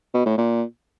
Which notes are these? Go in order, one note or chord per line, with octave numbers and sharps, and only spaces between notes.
B2
A2
A#2